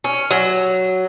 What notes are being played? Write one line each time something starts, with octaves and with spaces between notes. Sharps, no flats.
C#4
F#3